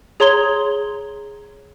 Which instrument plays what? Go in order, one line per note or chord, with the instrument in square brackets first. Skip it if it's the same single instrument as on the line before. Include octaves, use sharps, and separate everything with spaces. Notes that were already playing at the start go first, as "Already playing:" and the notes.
[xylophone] G#4 C#5 A#5 C6 G#6 G7